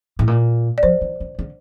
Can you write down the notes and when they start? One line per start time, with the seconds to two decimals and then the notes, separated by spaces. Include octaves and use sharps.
0.19 A2
0.27 A#2
0.78 D5
0.83 F3 C5
1.01 D#3
1.20 D3
1.39 D3